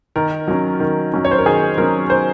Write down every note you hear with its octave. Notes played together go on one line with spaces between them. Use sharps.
D#3 A#4
F#3 C#4
D#3
F#3 C#4
C#5
C5
A#4
D#3 G#4
F#3 C#4 A#4
D#3 C5